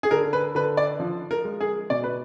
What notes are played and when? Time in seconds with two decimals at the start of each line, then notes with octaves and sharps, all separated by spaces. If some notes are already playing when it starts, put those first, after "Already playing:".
0.03 G#4
0.11 D3 A#4
0.33 B4
0.55 D3 B4
0.77 D5
1.00 F3
1.31 A#4
1.45 G#3
1.60 G#4
1.90 B2 D5
2.04 B4